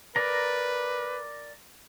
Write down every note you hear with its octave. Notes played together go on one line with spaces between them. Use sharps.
A#4 B4 D5 A#5